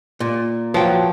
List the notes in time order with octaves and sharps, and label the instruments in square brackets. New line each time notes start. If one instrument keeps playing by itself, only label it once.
[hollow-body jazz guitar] A#2
[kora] F3 [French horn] F#3 [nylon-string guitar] B4 C#5 G5